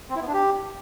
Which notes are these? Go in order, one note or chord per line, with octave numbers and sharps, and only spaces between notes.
C4
E4
B3
D4
G4